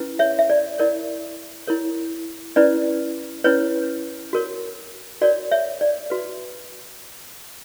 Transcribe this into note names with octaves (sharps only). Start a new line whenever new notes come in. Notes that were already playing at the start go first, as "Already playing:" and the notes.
Already playing: C#4 E4 B4
C#5 E5
E5
D5
E4 A#4 C#5 D5
E4 A#4 C#5
C#4 E4 B4 D5
C#4 E4 B4 C#5
F#4 A#4 C#5
F#4 A#4 C#5 D5
C#5 E5
D5
F#4 B4